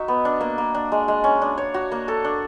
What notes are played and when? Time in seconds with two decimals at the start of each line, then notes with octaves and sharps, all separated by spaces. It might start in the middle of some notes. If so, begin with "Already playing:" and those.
Already playing: D#4 F#4 E5
0.08 B3
0.25 D4
0.41 A#3
0.58 A#3
0.75 D4
0.92 G#3
1.08 G#3
1.24 C#4
1.42 D4
1.58 C#5
1.74 F#4
1.92 A#3
2.08 A4
2.24 D4